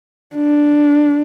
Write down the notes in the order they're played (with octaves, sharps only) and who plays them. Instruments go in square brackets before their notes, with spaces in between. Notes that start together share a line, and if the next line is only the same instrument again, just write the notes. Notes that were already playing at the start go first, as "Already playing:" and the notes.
[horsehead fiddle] D4